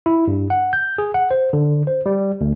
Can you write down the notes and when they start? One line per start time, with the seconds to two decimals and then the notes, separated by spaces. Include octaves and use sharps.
0.06 E4
0.27 G2
0.50 F#5
0.73 G6
0.98 G#4
1.14 F#5
1.31 C5
1.53 D3
1.87 C5
2.06 G3
2.41 D2